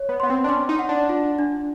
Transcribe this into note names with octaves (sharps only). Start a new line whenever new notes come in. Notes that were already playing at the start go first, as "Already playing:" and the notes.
Already playing: C#5
B3
B3 C6
C4
D4
C#4 C6
D#4
F#5
D4
F4
D4